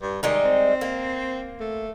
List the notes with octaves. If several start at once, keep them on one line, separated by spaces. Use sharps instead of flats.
G2
D#3 G3 G#3 D#4
C4
A#3
A3